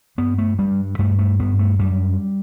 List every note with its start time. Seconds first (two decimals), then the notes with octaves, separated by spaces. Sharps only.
0.18 G2 B3
0.38 A3
0.59 G2 G3
0.99 G2 A3
1.19 A3
1.39 G2 B3
1.59 A3
1.79 F#2 G3